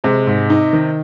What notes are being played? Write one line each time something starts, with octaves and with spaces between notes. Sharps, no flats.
C3 G#3
G#2
D#4
D#3